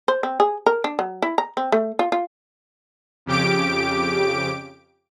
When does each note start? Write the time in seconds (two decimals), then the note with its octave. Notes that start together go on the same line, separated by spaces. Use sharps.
0.08 C5
0.23 C4
0.40 G#4
0.66 A#4
0.84 D4
0.99 F#3
1.22 E4
1.38 A#5
1.57 C4
1.72 A3
1.99 F4
2.12 F4
3.26 F2 C#3 G4 D6 D7